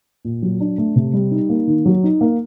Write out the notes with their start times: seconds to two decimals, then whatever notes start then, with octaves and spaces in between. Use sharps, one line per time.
0.25 A#2
0.42 F#3
0.60 D4
0.78 A3
0.96 C3
1.13 G3
1.31 D#4
1.49 A#3
1.67 D#3
1.86 F#3
2.04 D#4
2.21 A#3